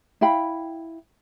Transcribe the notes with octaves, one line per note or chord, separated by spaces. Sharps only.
E4 F5 G5 B5